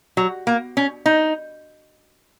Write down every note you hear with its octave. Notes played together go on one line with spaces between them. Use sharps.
F#3
A#3
C#4
D#4